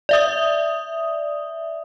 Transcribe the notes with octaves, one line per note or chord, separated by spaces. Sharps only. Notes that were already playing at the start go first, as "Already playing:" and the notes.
D5 E5 D#6